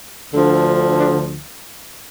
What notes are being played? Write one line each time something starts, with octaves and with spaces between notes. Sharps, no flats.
D2 D3 F3
D4